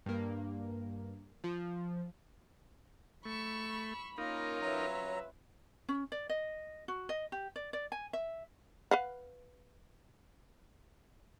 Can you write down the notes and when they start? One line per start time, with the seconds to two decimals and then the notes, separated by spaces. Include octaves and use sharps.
0.06 G2 A#3
1.44 F3
3.25 A3 B5 C#6 E6
4.18 A#3 C#4 D#4 F4 A#4
4.62 F#3 B4 E5 A#5
5.89 C#4
6.12 D5
6.29 D#5
6.88 F#4
7.09 D#5
7.32 G4
7.56 D5
7.73 D5
7.92 G#5
8.13 E5
8.91 B4 F5 F#5